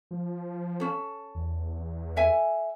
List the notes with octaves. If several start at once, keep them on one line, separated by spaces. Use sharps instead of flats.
F3
C#4 A4
E2
A4 E5 G#5